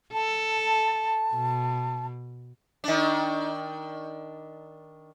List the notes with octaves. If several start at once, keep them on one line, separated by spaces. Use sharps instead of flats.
A4 A5
B2
D#3 D4